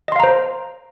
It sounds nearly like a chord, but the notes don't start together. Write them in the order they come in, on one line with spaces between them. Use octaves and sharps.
D#5 C6 F5 A#5 C5